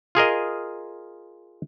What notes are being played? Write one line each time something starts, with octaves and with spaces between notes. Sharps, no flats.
F4 G#4 A#4 D#5